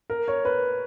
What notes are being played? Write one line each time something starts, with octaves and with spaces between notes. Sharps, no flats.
A#4
C#5
B4